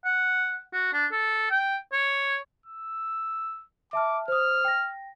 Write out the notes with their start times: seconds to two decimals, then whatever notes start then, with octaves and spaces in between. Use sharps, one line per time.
0.05 F#5
0.73 F#4
0.93 D4
1.12 A4
1.51 G5
1.92 C#5
2.66 E6
3.93 E5 A5 D6 F6
4.28 C5 D#6 F6
4.65 G5 A#6